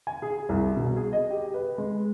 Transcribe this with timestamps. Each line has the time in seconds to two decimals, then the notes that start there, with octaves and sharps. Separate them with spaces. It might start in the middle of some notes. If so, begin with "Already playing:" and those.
0.07 G#5
0.22 G#4
0.49 C2
0.76 B2
0.96 G#4
1.13 D#5
1.30 G4
1.54 B4
1.78 G#3